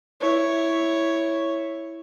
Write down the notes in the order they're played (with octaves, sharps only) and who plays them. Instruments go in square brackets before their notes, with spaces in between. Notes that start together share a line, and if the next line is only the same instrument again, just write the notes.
[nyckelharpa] E4 C#5